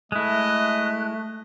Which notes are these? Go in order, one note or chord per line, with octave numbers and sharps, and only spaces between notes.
G#3 A3 E4 D#5 F#6